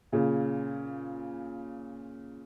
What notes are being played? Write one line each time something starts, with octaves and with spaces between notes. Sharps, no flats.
A#2 C#3